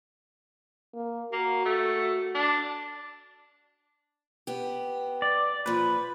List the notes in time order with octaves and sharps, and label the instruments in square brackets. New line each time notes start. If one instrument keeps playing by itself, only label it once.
[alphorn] A#3
[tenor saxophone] A#3 [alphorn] F#4
[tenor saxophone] A3
D4
[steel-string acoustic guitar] B3 G4
[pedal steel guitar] D5
[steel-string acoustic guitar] A#2 F3 [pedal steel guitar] B4